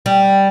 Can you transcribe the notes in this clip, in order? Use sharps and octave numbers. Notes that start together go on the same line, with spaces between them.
G3